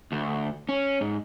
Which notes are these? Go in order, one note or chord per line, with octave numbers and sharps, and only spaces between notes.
D2
C#4
G#2